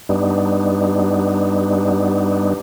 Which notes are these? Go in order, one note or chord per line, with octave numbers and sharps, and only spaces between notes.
G2 G3 B3 D4 D#4